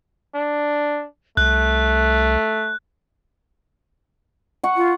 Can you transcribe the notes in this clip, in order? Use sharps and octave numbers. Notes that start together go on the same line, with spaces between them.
D4
C2 A3 F#6
F#5 C#6
F4